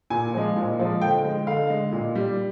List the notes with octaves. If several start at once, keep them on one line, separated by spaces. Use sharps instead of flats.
A#2 G#5
F3 G#3
A#2
F3 G#3
D3 G5
G#3
D3 F5
G#3
A#2
G3